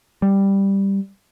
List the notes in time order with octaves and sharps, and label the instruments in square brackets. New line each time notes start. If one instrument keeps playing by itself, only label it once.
[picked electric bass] G3